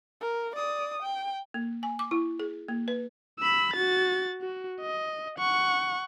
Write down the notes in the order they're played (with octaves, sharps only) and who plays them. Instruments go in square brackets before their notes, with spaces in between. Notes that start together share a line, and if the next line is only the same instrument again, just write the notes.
[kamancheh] A#4
D5 D#6
G5
[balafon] A#3
G#5
D6
E4
G#4
A#3
B4
[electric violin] B5 E6
F#4 A6
F#4
D#5
F#5 C#6